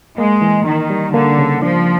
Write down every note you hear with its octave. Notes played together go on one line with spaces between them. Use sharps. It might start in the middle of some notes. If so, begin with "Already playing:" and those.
G#3 A#3
E3
D#3 D#4
G3
D3 A#3
C#3
F3 D4